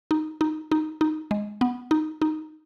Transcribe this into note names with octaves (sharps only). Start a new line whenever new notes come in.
D#4
D#4
D#4
D#4
G#3
B3
D#4
D#4